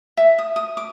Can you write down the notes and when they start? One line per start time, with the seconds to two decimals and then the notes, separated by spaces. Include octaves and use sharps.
0.17 E5
0.38 D#6
0.56 D#6
0.77 D6